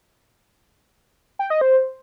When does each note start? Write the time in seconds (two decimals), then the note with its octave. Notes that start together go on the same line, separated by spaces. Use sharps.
1.39 G5
1.50 D#5
1.61 C5